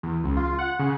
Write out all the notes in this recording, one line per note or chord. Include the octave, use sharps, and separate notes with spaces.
E2
C#2
F4
F#5
C#3